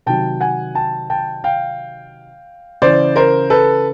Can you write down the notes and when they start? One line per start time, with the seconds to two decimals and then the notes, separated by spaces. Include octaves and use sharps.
0.06 C3 D#3 F#3 G5 A5
0.41 F#5 G#5
0.75 G5 A5
1.10 G5 A5
1.44 F5 G5
2.82 C#3 E3 C5 D5
3.16 A#4 C5
3.50 A4 B4